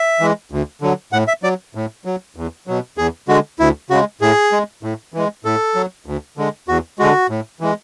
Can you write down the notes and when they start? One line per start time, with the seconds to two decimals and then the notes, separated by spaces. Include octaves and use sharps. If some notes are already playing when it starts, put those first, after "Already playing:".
Already playing: E5
0.20 E3 G#3
0.52 D2
0.82 D3 F#3
1.13 A2 F#5
1.28 E5
1.43 F#3 D5
1.75 A2
2.05 F#3
2.36 E2
2.67 B2 F#3
2.98 E2 G#4
3.28 D3 G#3 F#4
3.59 D2 E4
3.90 C#3 G#3 F#4
4.21 A2 G#4
4.52 G#3
4.83 A2
5.14 E3 G#3
5.45 A2 A4
5.75 F#3
6.06 D2
6.37 D3 G#3
6.68 E2 F#4
6.99 D3 G#3 F#4
7.30 A2
7.60 E3 G#3